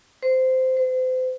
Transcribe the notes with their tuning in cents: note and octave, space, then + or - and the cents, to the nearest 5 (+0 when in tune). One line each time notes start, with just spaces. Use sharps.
C5 -15
C5 -35